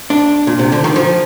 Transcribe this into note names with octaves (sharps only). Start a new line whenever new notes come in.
D4
A#2
C3
D3
D#3
F3